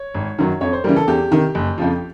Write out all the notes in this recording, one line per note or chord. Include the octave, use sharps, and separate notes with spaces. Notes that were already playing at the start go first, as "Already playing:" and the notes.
Already playing: C#5
G#1
F#2 D#3 F#3
F2 C#5
C5
C#3 E3 G3 A#4
A4
E2 G4
C3 D#3
F#1
F2 C#3 F3